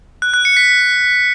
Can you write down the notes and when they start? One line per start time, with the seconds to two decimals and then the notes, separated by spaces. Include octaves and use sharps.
0.22 F#6
0.34 F#6
0.45 C#7
0.57 B6